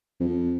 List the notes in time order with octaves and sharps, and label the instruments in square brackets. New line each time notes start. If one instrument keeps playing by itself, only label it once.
[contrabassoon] F2